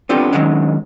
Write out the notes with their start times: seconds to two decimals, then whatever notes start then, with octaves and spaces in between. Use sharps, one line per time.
0.09 B3 C4 D4 F4 G4 A4
0.33 D#3 E3 F#3 G#3 C#4 D4